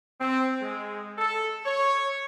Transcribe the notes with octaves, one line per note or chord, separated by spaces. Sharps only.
C4
G#3
A4
C#5